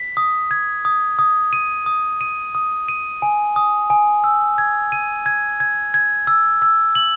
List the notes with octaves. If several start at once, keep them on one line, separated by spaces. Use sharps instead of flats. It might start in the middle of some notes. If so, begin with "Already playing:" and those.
Already playing: B6
D#6
G#6
D#6
D#6
D#7
D#6
D#7
D#6
D#7
G#5
D#6
G#5
E6
G#6
D#7
G#6
G#6
G#6
E6
E6
F#7